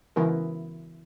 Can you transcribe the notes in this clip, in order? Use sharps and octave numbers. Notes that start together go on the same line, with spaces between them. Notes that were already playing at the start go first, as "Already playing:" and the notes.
C#3 E3 B3 E4 A#4